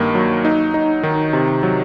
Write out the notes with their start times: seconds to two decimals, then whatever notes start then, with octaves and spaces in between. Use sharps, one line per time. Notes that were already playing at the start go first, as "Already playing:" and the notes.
Already playing: G2 D#3 A#3
0.15 F#3
0.45 D#4
0.74 D#4
1.03 D#3
1.33 C3
1.63 F#3